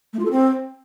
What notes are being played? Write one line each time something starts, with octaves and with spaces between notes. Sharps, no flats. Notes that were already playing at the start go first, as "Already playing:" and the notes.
A3
F4
A4
C4